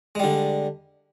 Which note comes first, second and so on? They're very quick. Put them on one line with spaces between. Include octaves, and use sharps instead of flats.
G#3 G3 D3